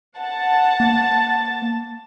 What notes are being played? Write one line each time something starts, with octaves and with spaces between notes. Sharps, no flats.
F#5 A5
A#3